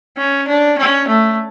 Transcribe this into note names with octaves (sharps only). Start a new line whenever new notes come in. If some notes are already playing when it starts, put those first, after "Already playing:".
C#4
D4
C#4
A3